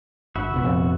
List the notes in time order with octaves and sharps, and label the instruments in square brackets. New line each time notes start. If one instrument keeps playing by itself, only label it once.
[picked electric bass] G1 [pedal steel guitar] F#4 E5 B5
[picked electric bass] F1 A#1 B3
[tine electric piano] F2